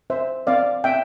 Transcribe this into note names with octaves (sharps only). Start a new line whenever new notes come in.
C4 C5 E5
C4 D5 F5
C4 E5 G5